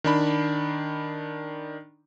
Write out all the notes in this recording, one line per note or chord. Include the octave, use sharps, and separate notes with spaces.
D#3 D4 B5